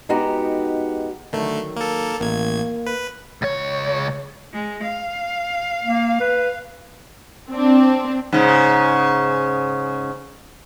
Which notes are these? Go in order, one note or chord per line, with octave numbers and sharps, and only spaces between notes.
G#3 B3 D#4 F#4 G4
D3 D#3 F#3 A3
A#3 A4
A1 D#2 A#3 G#6
B4
C#2 C#5
G#3
F5
A#3
B4
C4 D4
G#2 C#3